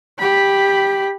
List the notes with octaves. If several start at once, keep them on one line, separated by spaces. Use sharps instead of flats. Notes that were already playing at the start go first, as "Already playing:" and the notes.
G4 B5